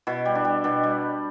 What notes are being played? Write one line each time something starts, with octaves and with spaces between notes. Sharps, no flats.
B2 E4
G3
D4
G3
B2 D4
G3